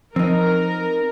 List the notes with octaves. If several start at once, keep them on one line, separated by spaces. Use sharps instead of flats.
F3 C4 D#4 A#4